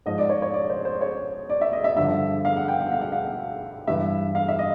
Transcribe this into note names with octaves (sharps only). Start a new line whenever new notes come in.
G#2 F3 D#5
D5
C#5
C#5
D5
C5
C5
C#5
D5
E5
D#5
E5
G2 D3 F3 E5
F5
F#5
G5
F#5
F5
F#5
F5
G2 E3 E5
F5
E5
D#5